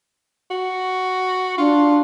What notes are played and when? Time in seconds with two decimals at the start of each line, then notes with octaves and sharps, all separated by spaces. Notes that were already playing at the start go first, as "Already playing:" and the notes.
0.50 F#4
1.58 D4 F4